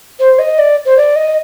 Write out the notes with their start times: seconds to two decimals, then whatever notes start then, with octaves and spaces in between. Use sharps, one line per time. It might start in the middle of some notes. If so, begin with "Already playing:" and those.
0.20 C5
0.39 D#5
0.58 D5
0.86 C5
0.97 D5
1.16 D#5